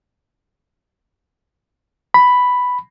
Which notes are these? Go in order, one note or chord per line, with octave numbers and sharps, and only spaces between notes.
B5